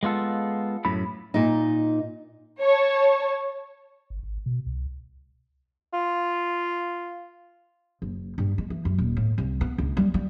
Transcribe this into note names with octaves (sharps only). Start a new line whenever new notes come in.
G#3 B3 F4 A4
F#2 A2 B5
A#2 D#4
C#5 A5
G1
G#1
B2
C2
F4
F#1
G2
G#3
E3
F#2
D#1
A2
C2
B3
C#2
G3
G3